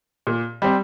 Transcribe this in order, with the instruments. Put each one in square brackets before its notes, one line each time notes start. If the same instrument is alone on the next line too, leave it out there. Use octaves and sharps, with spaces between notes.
[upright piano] A#2
G3 C4